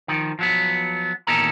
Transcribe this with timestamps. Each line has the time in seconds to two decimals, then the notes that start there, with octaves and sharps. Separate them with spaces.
0.08 D#3 F3
0.39 F3 F#3 B3
1.27 E2 A#2 D#3 C#4 A4 A#5